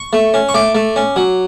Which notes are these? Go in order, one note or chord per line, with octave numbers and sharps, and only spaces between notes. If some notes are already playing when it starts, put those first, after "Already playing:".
Already playing: C#6
A3
C#4
C#6
A3 D6
A3
C#4
F#3